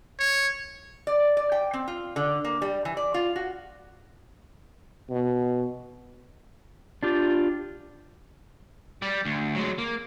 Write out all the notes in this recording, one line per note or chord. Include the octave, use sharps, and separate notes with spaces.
C#5
D5
D5
G5
C4
F4
D3
A#3
G3
E3
D5
F4
F#4
B2
D4 F4 G4
G3 D5
D2
F#3 G#3
A#3